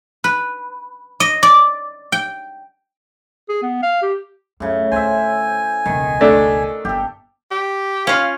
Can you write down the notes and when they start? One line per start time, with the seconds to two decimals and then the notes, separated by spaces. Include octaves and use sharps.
0.24 B4
1.20 D#5
1.43 D5
2.12 G5
3.49 G#4
3.62 B3
3.82 F5
4.02 G4
4.60 F#2 A2 C#3
4.92 D2 C5 E5 G#5
5.86 E1 C#2 D#3
6.21 A3 D4
6.85 G1 G4 A4
7.51 G4
8.07 C#4 F4 F5